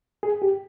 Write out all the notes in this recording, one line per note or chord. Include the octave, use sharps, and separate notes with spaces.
G#4
G4